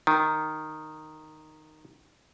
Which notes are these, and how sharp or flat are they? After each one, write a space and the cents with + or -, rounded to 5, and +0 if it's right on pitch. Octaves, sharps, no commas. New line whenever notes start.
D#3 -5